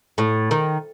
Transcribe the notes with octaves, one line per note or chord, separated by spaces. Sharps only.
A2
D#3